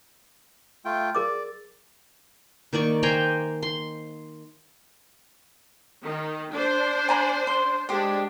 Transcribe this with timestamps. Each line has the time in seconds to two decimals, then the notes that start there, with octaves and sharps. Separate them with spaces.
0.85 A3 F4 G5
1.15 G#4 A#4 D5 D6
2.73 D#3 A#3 D5 C#6
3.03 C5 G5 G#5 A#5
3.63 C6
6.04 D#3
6.53 D4 C5
7.09 G#5 A#5 B5
7.47 C6
7.89 G#3 D4 G4 C5